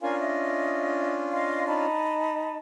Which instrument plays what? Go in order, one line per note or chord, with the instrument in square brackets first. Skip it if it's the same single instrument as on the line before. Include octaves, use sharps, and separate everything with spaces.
[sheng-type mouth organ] C#4 D4 F4 [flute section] A#4 F5 G#5
[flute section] D#5 E5
D#5 F5 C6
D#4 A5 B5